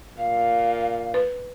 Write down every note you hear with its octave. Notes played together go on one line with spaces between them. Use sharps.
A#2 F5
B4